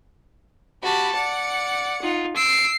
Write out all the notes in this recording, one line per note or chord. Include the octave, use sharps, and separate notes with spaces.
F#4 G4 A5 B5
D5 F#5 C#7
D#4 F4
E6 C7 D7